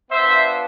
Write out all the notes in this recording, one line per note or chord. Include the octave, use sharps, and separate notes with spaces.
B3 D4 F4 C5 E5